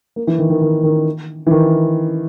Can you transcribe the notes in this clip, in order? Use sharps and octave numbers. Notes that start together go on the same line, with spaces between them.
A#3
E3
D#3
D#3
D#3
D#3
E3
D#3